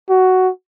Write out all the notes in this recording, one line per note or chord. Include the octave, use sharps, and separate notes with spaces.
F#4